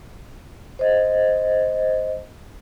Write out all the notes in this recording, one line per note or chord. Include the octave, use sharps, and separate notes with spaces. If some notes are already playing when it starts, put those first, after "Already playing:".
C5 D#5